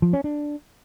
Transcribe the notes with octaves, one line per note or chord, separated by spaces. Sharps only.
F3
C#4
D4